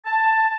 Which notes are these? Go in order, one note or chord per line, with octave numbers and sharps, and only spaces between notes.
A5